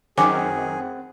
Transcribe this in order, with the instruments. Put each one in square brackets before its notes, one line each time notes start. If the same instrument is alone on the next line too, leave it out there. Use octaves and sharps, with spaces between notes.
[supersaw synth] F#2 D#3 [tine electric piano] C4 F#5 [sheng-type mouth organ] G#4 [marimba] G#5 D6